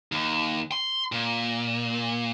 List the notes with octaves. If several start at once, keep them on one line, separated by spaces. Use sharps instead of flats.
D#2
C6
A#2